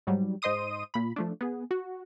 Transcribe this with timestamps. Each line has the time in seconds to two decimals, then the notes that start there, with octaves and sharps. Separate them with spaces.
0.07 G#2 F#3 G3
0.42 G#2 C5 D#5 C6 D#6 D#7
0.94 A#2 B5
1.16 F3 A3 D4
1.41 B3 G#4
1.71 F#4